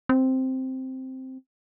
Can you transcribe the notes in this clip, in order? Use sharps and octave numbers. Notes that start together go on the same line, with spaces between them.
C4